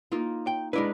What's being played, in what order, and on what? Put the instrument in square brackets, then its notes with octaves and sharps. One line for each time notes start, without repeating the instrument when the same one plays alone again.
[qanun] A#3 D#4 F4
[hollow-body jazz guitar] G5
[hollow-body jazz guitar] G#3 D4 B4 [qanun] E4 A#4